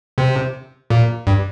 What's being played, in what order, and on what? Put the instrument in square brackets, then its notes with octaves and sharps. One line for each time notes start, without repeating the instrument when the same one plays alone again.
[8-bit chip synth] C3
A#2
G2